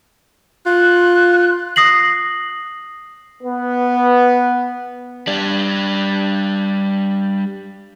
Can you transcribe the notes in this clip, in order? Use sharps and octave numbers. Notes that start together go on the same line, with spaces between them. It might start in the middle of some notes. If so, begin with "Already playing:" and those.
F4 F#6
D#6 A#6 C7 F#7
B3 B4
G3 D4